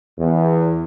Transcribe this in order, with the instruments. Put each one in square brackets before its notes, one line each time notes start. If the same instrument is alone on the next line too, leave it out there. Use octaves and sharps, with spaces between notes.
[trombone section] E2